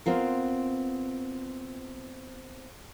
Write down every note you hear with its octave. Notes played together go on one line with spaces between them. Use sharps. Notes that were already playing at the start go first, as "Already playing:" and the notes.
B3 C4 F4 A#4